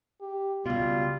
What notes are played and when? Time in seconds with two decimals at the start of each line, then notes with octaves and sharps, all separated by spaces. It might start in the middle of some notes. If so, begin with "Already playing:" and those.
0.21 G4
0.66 C#2 B2 G3 F4